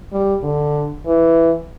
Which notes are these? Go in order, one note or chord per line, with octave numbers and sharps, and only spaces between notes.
G3
D3
E3